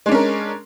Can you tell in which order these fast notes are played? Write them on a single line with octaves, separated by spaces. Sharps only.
G#3 D4 C#4 A#4